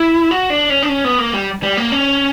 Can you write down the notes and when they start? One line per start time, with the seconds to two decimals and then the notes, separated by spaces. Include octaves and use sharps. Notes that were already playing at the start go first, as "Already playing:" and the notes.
Already playing: E4
0.31 F#4
0.50 D4
0.70 C#4
0.83 D4
0.89 C#4
1.05 B3
1.19 A#3
1.34 G3
1.63 G3
1.77 A#3
1.92 C#4